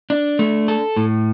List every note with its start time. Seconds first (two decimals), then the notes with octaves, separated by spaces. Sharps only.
0.10 D4
0.39 A3
0.68 A4
0.97 A2